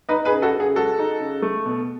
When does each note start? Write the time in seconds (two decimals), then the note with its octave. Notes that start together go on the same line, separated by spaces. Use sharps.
0.09 D#4 B4 D#5
0.25 G#4 B4
0.31 C#3
0.42 F#4 A4
0.54 C#3
0.60 G#4
0.76 G#3 F#4 A4
0.99 D#4
1.20 C#3
1.42 A3
1.66 B2